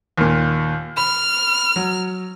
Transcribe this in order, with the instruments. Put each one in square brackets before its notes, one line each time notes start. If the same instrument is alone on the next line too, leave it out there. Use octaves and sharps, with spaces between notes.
[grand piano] D#2 A#2
[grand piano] B5 [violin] F6
[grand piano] F#3